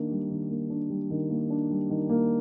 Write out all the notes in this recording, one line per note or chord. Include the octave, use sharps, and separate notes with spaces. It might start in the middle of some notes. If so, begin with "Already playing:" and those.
Already playing: D#3 A#3 D4
G3
D#3
A#3
D4
G3
D#3
A#3
D4
G3
D#3
A#3